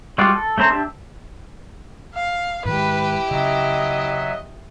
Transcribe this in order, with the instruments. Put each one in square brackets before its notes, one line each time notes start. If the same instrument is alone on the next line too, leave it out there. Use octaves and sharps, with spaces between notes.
[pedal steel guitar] G3 G#3 F4 F#4 D5
A4
A3 C#4 C5 A#5
D4 G4 E5 A5
[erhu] F5
[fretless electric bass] G#2 D#3 G#3 [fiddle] E4 G4 [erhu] B4
[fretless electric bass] C#3 [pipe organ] F#3 E5 [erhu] D#5